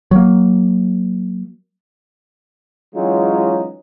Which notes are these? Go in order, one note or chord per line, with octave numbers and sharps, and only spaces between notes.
F#3 A#3
E3 F#3 G#3 C#4 D#4 F4